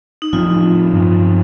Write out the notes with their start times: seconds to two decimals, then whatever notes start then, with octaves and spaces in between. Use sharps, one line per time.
0.22 D#4
0.33 A2 F3 C4 F4
0.93 G2 F3 C4